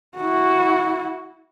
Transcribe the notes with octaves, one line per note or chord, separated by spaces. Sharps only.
E4 F#4